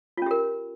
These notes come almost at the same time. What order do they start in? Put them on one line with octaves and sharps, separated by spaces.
F4 C#4 G4 A#4